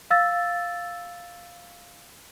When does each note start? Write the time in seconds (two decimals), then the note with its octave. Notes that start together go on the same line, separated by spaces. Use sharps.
0.11 F5 E6 A6